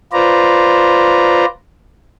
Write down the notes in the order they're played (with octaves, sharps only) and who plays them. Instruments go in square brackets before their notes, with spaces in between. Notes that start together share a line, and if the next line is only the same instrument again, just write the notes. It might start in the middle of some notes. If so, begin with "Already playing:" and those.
[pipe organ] F4 B4 C5 D5 A#5